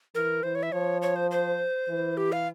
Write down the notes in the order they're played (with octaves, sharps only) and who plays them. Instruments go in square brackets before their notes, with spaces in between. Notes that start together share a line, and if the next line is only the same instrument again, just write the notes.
[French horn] E3 [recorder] A#4
[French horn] E3 [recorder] C5
[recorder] C#5
E5
[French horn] F3 [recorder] C#5
[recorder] C#5
C5
C5
[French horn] E3
[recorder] G4
F5